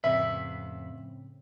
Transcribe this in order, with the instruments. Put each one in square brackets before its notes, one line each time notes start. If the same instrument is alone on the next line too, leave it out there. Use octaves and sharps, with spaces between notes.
[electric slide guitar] F2 B4 [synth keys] A2 C#3 C4 [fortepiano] E5